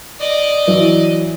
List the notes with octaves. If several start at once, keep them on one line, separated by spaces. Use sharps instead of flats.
D5 D#5
E3 F#3